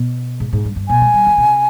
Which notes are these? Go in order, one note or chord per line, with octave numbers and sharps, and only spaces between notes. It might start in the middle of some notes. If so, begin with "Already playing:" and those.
Already playing: B2
G#2
G#2
G2
G2
B2 G#5
G#3
G3
D#3
C3